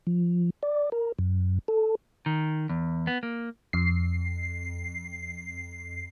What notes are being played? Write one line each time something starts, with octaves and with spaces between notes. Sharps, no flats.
F3
D5
A#4
F#2
A4
D#3
E2
B3
A#3
F2 C7